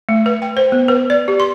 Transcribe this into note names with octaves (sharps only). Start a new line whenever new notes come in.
A3
B4
G5
C5
B3
B4
D5
G4
C6